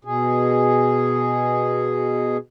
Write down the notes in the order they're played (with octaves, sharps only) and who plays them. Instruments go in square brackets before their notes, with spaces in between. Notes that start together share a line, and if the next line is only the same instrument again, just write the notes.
[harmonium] B2 G#4